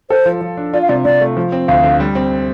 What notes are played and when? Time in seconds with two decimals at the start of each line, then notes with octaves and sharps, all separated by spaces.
0.10 A4 C5
0.26 F3
0.41 F3
0.57 D4
0.73 F4 D5
0.82 F5
0.89 C3 D5
1.04 C3 D5
1.21 A3
1.37 F3
1.52 C4
1.68 D2 F5
1.84 D3
2.00 G3
2.15 C4